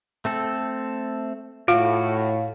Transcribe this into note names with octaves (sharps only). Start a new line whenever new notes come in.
A3 C4 A4
A2 F4 F#4 F5